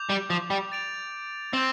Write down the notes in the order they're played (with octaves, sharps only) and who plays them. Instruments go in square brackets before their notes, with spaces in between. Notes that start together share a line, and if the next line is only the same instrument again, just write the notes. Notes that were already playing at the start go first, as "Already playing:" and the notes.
Already playing: [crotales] D6 G6 F7
[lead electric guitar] G3
F3
G3
[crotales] A6 D7 F7
[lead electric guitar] C4 [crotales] G6 D7 G7